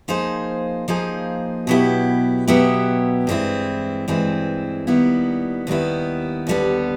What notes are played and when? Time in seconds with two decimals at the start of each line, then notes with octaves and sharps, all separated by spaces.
0.08 F3 A#3 D#4 G#4 C5
0.88 F3 A#3 D#4 G#4 C5
1.67 B2 F#3 B3 E4 G4
2.48 B2 F#3 B3 E4 G4
3.27 G2 E3 G#3 C4 E4
4.08 G2 E3 G#3 C4 E4
4.87 D#2 D#3 G3 B3 E4
5.67 D#2 D#3 G3 B3 E4
6.47 D#2 D3 G3 B3